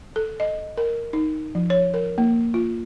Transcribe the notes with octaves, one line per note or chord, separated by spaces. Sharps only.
A4
D#5
A#4
D#4
F3
C#5
A#4
A#3
F4